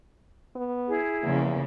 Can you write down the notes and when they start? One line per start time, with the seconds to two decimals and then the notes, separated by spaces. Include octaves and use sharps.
0.55 B3
0.87 E4 G#4
1.23 E2 C#3 F3 A#3